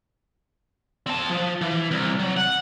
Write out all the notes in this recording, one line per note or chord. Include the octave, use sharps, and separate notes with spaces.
C4 A5
F3
E3
C2
F#3
F#5